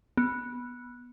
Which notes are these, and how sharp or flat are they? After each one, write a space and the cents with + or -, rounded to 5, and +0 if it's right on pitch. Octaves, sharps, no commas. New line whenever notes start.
B3 -10